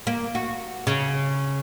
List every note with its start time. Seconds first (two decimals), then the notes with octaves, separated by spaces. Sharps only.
0.07 A#3
0.35 F#4
0.87 C#3